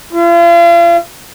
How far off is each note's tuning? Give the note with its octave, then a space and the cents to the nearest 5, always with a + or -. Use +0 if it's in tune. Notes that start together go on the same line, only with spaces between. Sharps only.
F4 -40